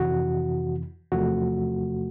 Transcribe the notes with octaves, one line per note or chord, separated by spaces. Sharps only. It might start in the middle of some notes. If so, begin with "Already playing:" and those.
Already playing: F2 C3 E3 F#4
E2 C3 F3 A3 F#4